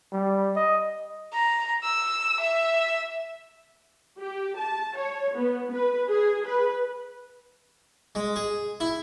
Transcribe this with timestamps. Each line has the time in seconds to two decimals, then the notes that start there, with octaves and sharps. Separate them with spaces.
0.13 G3
0.56 D#5
1.33 A#5
1.83 E6
2.40 E5
4.20 G4
4.57 A5
4.96 C#5
5.35 B3
5.73 B4
6.09 G#4
6.46 B4
8.15 G#3
8.36 G#4
8.80 E4